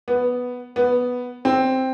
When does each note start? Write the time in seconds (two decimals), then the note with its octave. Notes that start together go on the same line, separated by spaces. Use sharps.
0.08 B3
0.76 B3
1.45 C4